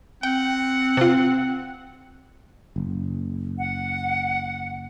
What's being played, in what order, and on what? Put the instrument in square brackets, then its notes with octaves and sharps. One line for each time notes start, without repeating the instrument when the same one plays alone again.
[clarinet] C4 [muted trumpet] F#5 [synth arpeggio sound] G5
[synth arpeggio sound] C3 F4
[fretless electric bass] F#1
[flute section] F#5